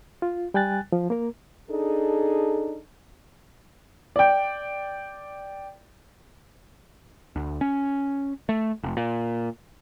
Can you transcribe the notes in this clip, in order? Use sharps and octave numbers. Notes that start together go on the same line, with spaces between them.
F4
G3 G5 G#5 F#6 A6
F3
A#3 A#4
D4 D#4 G#4 A4
D5 G5
D2
C#4
A3
F1
A#2